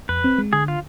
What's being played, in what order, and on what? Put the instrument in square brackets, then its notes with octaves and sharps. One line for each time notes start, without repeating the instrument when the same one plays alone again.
[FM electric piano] F2 [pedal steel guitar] B4
[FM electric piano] C4
G#3
[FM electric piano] D3 [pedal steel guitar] G#4
[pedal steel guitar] F4